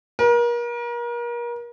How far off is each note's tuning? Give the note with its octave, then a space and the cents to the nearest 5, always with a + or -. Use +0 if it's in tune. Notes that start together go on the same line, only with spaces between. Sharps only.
A#4 +35